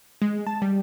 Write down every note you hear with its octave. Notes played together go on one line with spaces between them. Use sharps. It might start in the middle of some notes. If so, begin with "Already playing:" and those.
G#3
A5
G3